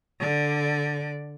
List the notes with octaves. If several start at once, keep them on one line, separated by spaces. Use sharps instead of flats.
D3 D5